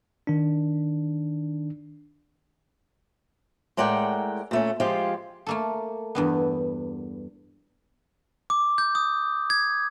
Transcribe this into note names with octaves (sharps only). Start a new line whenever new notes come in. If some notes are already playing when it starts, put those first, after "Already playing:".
D#3 D4
A2 G#3 A#4 D5 F#5 G5
A#2 A3 C#4
F3 G#3 F4 G4
A3 A#3 A4
E2 G2 B3
D6
G6
D#6
G#6